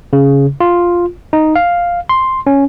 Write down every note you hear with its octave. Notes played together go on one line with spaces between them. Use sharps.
C#3
F4
D#4
F5
C6
C#4